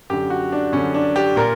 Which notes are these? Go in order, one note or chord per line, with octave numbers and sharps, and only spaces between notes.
F#2 D3 G4
F#4
D4
F#2 D3 C#4
D4
G4
A#2 A#4